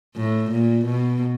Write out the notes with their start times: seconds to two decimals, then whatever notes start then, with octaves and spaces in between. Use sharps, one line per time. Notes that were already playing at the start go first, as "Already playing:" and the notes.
0.16 A2
0.51 A#2
0.86 B2